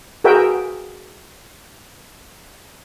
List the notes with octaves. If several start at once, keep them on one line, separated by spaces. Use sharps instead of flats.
F#4 G#4 A#4 B4 E5 G5